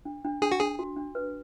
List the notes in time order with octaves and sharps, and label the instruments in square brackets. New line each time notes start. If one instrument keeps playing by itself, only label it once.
[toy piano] D4
D4
[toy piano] D4 [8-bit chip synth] G#4
[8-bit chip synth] F#4
[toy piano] D4 [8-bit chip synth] G#4
[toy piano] F#4
D4
B4